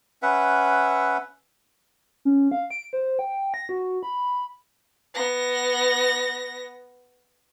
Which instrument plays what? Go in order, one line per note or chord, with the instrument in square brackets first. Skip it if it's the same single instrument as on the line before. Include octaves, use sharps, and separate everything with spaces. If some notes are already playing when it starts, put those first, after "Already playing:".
[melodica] C#4 B4 E5 F#5
[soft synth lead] C#4
F5
D7
C5
G5
A#6
F#4
B5
[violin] B3 A#6